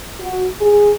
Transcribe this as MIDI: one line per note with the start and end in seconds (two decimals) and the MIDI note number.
0.20 0.47 66
0.60 0.92 68